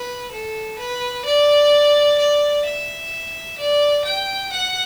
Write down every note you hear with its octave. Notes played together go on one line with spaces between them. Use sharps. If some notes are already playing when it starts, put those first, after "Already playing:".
Already playing: B4
A4
B4
D5
D5
E5
D5
G5
F#5